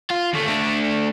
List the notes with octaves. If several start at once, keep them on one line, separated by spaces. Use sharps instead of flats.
F4
D#2 A3
A3 D4